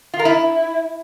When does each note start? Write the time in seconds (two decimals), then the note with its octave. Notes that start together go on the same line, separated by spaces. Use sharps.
0.14 F4
0.19 A#4
0.25 E4